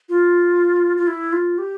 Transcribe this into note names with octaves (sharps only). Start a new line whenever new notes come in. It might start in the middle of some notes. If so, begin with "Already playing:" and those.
F4
F4
E4
F4
G4